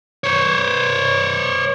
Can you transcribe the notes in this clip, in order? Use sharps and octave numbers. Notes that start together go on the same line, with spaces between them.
C5 C#5